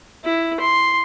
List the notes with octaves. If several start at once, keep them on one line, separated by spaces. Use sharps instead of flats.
E4
C6